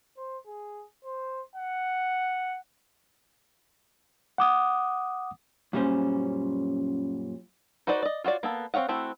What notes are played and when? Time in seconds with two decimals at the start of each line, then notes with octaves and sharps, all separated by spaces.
0.17 C5
0.47 G#4
1.04 C5
1.56 F#5
4.38 F#5 D6 D#6
5.73 F#2 A#2 G3 C#4 C5
7.87 D#4 F#4 B4 C5 D5
8.03 D5 D#5
8.24 F4 F#4 C#5 D5
8.43 A#3 B3 A4
8.74 C4 D#4 C#5 F5 F#5
8.88 A3 C4 E4 F#4